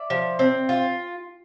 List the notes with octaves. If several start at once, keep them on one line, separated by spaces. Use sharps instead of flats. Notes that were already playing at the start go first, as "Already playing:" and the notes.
Already playing: D5 E5
F3
C4
F4